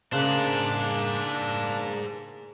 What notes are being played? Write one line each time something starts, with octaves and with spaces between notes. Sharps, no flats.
C#3 A#3 D4 G#4 C5 F#6